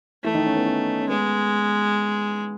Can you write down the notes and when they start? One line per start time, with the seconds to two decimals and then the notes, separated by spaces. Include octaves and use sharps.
0.24 E3 A3 E4
0.35 D#3 D#4
0.46 C#4
0.57 B3
0.66 C#4
1.01 C#4
1.09 G#3 B3